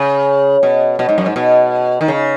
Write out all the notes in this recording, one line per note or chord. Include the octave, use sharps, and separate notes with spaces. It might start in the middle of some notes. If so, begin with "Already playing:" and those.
Already playing: C#3
B2
B2
G#2
F#2
G#2
B2
D#3
C#3